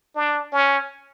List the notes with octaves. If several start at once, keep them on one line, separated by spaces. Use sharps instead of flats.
D4
C#4